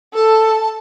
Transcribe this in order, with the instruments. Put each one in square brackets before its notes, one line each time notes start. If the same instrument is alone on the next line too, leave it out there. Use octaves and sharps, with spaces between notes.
[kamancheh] A4 [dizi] A5